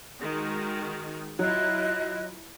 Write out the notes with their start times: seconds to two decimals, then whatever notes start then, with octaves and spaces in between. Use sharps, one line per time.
0.21 D#3 G#3 F#4
1.39 F#3 E4 F4 D#5 F#6